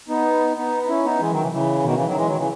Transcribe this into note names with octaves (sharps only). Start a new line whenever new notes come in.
B3 D#4
B3 D#4
D#4
C#4 E4
B3 D#4
E3 G#3
D#3 F#3
C#3 E3
C#3 E3
B2 D#3
C#3 E3
D#3 F#3
E3 G#3
D#3 F#3
C#3 E3